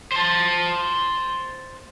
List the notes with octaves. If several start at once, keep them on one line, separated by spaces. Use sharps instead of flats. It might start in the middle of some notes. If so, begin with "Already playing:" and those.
C5 A5